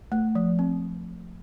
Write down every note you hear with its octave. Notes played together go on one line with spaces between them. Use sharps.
A3
F3
C4